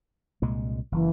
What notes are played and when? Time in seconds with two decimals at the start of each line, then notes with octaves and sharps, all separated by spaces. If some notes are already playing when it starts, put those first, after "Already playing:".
0.42 C2 A#2 G#3
0.92 F#1 E3